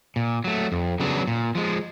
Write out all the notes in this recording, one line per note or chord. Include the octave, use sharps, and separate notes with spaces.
A#2
F#3 A3
F2
C#3 F#3 B3 D4
A#2
F3 G#3